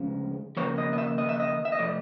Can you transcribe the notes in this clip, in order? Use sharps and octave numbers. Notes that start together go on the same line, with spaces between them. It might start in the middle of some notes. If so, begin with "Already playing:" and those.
Already playing: D2 C#3 F3 G#3
D#2 C#3 F3 A#3 C#5
D#5
D#5
E5
D#5
E5
D#5
E5
D#5
C3 F3 A3 D5